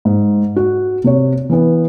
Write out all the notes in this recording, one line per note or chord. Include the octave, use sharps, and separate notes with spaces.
G#2
F#4
C3 C#5
E3 B3